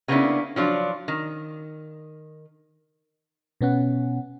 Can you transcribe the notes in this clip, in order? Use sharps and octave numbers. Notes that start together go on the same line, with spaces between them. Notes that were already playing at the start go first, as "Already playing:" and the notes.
C#3 A#3 B3 C#4 D4 E4
F3 F#3 D4 F4
D#3
B2 B3 C#4 F#5